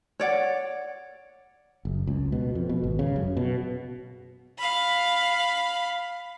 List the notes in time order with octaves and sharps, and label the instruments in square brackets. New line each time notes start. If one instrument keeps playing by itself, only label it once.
[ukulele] C#5 D5 F#5
[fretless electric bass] F#1
C#2
B2
F2
B2
G#1
C#3
F#2
B2
[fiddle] F5 B5